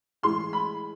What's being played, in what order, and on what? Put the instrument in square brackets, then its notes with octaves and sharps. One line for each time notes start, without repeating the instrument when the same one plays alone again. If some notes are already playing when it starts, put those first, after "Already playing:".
[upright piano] A2 E3 G#3 C6
B5